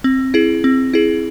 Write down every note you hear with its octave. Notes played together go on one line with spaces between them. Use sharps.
C4
E4 G#4
C4
E4 G#4